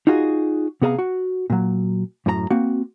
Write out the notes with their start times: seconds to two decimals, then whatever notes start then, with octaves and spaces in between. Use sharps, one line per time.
0.07 D#4 F4 F#4 G#4
0.82 C3 B3 G#4 D#5 F5 A#5
0.98 F#4
1.50 A#2 F#3
2.26 F#2 A2 A#4 A#5
2.50 A#3 C4 F#4